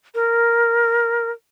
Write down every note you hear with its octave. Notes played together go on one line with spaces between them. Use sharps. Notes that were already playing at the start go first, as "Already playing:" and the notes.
A#4